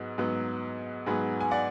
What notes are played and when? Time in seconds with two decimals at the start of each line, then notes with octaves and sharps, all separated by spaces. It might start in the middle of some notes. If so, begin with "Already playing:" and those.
Already playing: G#2 F#3 B3
0.18 G#2 F#3 B3
1.06 G#2 F#3 B3 G#4 B4
1.41 G#5
1.51 D5 F#5